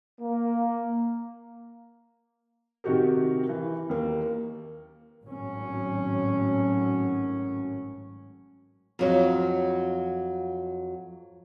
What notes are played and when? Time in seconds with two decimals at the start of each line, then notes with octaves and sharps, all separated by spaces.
0.20 A#3
2.84 C3 D#3 F#4 G4 A#4
3.49 E3
3.90 D#2 A#3
5.26 G#1 A2 F#3 C#4
8.99 F2 F#3 D#5